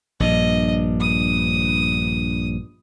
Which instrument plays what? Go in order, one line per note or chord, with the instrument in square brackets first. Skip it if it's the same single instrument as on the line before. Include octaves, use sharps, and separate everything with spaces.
[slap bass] A#1 G2 [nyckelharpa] D#5
[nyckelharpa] D#6